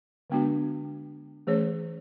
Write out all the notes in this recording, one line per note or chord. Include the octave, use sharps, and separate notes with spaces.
D3 G#3 B3 D4 F#4
E3 A3 C#4 G#4 C#5